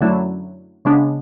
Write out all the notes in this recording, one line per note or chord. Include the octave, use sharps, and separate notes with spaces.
F#2 D3 F#3 A3 E4
C#3 G#3 B3 D4